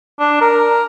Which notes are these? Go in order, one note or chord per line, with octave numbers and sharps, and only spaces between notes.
D4
A#4